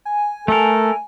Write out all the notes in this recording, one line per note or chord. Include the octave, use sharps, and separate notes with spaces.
G#5
A3 A4 A#4